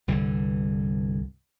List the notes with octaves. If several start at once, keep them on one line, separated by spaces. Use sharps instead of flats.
C2 G2 D3 E3